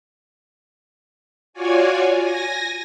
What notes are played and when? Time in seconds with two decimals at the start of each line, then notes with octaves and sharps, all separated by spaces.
1.53 F4 F#4 C#5 D5 G#5
2.19 G#5 A#6